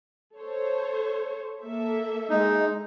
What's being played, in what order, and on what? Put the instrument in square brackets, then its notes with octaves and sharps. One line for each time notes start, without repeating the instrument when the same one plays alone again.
[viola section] A4 C5 C#5
A#3 A4 E5
[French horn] G#3 [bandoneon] D#4